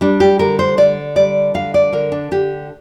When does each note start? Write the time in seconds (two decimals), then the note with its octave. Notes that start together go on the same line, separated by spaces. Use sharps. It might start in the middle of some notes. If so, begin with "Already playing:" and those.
0.01 G3 D4
0.20 G4
0.39 D3 A#4
0.59 C5
0.77 D3 D5
1.16 G3 D5
1.54 D3 F5
1.74 D5
1.93 D3 A#4
2.12 D4
2.31 D3 G4